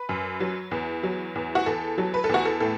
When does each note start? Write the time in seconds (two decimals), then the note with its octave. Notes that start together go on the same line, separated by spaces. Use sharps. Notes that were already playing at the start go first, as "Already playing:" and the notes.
Already playing: B4
0.09 F#2
0.40 F#3
0.71 E2
1.03 F#3
1.35 E2
1.55 F#4
1.66 E2 A4
1.98 F#3
2.14 B4
2.24 A4
2.29 E2 F#4
2.45 A4
2.60 A2 A4